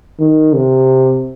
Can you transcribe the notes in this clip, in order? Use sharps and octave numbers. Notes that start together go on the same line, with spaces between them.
D#3
C3